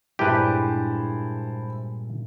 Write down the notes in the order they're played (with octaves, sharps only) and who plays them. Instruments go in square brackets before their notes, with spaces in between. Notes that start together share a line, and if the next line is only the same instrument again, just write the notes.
[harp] G2 A#2 G#3 [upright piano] E4 C5 A5 [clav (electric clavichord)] G4 B4